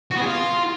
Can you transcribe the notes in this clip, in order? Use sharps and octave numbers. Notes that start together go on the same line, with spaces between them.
F#4
B3
G#4
F4